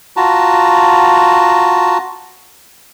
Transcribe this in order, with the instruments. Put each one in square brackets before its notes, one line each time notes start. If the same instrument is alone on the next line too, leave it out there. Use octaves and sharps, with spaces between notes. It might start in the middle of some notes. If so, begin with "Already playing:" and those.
[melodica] F4 F#4 A5 A#5